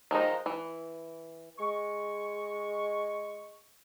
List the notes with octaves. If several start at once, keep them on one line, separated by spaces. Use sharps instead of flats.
D#3 F3 G#3 D#4
E3
G#3 C#6